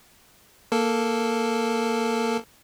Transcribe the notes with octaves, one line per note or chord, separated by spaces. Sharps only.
A#3 A4